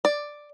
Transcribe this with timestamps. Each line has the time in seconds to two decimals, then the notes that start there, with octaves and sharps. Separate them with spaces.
0.05 D5